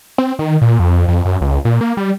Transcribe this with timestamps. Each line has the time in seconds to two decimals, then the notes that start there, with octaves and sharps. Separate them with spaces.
0.18 C4
0.39 D#3
0.62 A#2
0.79 F2
1.08 F2
1.25 F#2
1.41 C#2
1.65 A#2
1.81 A#3
1.97 G3